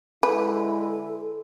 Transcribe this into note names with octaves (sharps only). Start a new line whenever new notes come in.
D3 G#3 E4 A4 B4